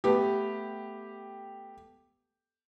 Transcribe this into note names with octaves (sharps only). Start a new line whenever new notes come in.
A3 B3 G4